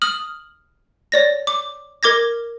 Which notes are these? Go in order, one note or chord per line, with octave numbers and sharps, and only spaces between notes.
D#6 F6 F#7
C#5 D5 A#6
D6
A#4 D6 G#6 A#6